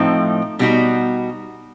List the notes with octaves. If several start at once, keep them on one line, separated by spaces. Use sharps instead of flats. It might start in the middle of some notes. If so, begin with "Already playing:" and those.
Already playing: A2 F3 A3 C4 D#4
B2 G3 B3 D#4 F#4